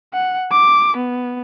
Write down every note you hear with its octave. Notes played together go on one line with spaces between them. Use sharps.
F#5
D6
B3